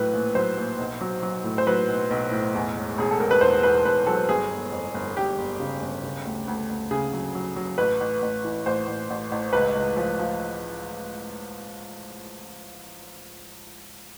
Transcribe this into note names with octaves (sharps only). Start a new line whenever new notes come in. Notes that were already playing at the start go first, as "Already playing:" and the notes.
Already playing: A#1 A2 F#3 B4
A#1
F#3 C5
A#1
B1
F#3
F#3
A2
C5
F#3 B4
B1
B1
A2
E2
E1
E1 G#4
A4
E1 A#4
B4
E2 C5
E2 B4
E1 B4
F#3 A4
G1 G#4
G1
F2
G1
G1 G4
G1
C#3
G1
C#3
D2
D2
D2
C#3 G#4
F#3
F#3
F#3
A1 B4
A1
A1
E3
A1 C5
A1
A1
A1
C#2 B4
C#2
F3
F3